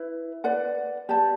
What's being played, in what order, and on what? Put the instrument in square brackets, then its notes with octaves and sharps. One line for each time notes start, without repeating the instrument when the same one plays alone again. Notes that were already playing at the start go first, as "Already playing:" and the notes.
Already playing: [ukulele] E4 B4
B4 D5 F#5
G4 D5 A5